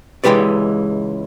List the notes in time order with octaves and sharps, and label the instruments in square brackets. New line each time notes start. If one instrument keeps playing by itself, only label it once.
[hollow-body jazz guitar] C#2 E3 G#3 G4 B4 D5